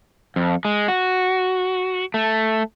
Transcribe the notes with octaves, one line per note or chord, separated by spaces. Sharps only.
F2
G#3
F#4
A3